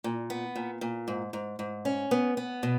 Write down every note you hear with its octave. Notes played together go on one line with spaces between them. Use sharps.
A#2
B3
A#2
A#2
G#2
G#2
G#2
C#4
B3
B3
B2